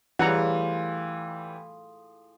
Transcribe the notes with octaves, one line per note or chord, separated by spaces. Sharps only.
A2 E3 G3 F4 G#4 F#5 A#5